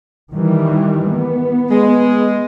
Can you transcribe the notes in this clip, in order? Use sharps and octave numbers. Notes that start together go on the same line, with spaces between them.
D#3 E3 G3
B3
G#3